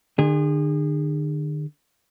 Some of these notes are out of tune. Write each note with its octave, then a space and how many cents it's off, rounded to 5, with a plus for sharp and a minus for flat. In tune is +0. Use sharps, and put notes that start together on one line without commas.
D3 +40 G#4 -30